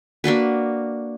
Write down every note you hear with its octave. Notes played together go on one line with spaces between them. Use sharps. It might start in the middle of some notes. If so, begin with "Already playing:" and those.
A#3 D4 F#4 B4